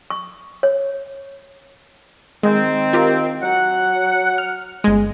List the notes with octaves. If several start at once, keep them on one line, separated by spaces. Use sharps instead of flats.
C#6
C#5
D#3 G#3 C4
F4 G4 A#4
F#3 F#5
F6
G1 G#3